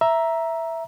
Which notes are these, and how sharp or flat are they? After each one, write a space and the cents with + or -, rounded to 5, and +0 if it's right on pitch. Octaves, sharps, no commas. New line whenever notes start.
E5 +0 A#5 +10